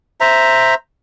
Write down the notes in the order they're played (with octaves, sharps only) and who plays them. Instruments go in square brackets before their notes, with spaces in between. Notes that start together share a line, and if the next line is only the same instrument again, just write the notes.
[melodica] C5 E5 A#5